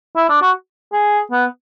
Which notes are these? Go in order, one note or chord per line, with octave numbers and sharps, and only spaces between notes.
E4
D4
F#4
G#4
B3